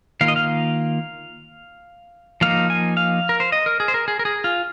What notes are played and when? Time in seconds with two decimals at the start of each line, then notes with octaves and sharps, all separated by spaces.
0.21 D#3 A#3 F4 F5
0.28 D#5
0.36 F5
2.41 F3 A#3 D#4 F5
2.70 G#5
2.97 F5
3.29 A#4
3.40 C5
3.52 D#5
3.66 A#4
3.80 G#4
3.88 C5
3.94 A#4
4.08 G#4
4.19 A#4
4.25 G#4
4.44 F4